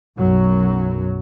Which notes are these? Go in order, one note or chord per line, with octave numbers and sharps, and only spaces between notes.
B1 F#2 F#3